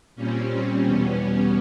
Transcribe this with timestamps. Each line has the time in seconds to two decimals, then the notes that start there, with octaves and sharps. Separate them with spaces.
0.16 A#2 G3 C4 C#4
0.83 E2 B2 G3 B3 C#4